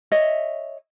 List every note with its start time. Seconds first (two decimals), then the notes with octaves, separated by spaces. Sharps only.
0.12 C#5 D#5 E5